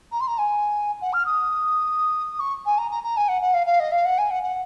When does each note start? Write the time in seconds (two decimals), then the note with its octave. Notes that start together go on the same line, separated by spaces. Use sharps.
0.11 A#5
0.20 C6
0.27 A#5
0.38 G#5
1.01 F#5
1.12 F6
1.25 D#6
2.39 C#6
2.65 G#5
2.78 A#5
2.90 A#5
3.03 A#5
3.16 G#5
3.28 F#5
3.41 F#5
3.53 F5
3.66 F5
3.79 D#5
3.91 F5
4.05 F#5
4.18 G#5
4.30 F#5
4.43 F#5